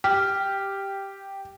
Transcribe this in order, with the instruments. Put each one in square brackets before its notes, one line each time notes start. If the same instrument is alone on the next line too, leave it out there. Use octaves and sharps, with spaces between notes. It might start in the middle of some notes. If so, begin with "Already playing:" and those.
[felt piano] G4 [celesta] F6